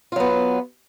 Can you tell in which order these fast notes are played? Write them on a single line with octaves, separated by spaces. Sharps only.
F4 F#3 B3